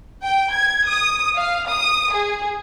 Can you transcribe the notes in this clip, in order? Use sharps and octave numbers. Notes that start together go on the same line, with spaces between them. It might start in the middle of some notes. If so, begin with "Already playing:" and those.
G5
G#6
D#6
F5
D#6
G#4